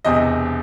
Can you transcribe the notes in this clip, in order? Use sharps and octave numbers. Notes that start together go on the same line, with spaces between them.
E1 E2 C3 D#5